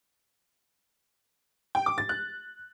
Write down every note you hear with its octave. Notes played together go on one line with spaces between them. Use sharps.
G5
D6
A6
F#6